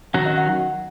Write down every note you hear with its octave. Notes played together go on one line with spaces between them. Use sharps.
D#3 F#3 C#4 F#4 F#5
D#5
F#5
F#5